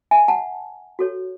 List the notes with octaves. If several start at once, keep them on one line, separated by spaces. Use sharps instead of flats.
E5 G#5
F#5 A5
F#4 A4 C#5